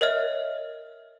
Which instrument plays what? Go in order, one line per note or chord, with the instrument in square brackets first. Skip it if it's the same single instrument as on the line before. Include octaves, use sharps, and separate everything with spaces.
[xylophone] A#4 C#5 D#5 E5 F6